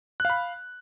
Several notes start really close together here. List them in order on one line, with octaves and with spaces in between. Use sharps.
F#6 F5 B5